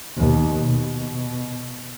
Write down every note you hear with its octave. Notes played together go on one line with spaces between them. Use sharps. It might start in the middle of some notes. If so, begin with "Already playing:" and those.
D#2 B2
B2